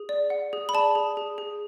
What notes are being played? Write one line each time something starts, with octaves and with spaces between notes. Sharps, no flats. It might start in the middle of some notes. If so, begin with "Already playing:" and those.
Already playing: G#4
D5
F#5
G#4
B5
D5 A5
G#4
G#4
G#4